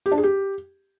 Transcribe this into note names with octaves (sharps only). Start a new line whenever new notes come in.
G4
D4
G#4
G4